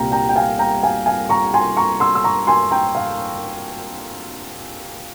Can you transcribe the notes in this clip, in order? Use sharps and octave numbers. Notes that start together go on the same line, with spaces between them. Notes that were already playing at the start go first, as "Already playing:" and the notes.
Already playing: C2 A#2 G3 F5 G5 A#5
G5 A#5
G5
F5 G#5
G5 A#5
F5 G#5
F5 G#5
A#5 C#6
G#5 C6
A#5 C#6
C6 E6
E6
A#5 C#6
G#5 C6
G5 A#5
F5